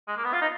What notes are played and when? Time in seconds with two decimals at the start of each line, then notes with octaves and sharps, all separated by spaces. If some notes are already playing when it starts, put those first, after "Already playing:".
0.08 G#3
0.17 A#3
0.24 B3
0.33 F4
0.42 D#4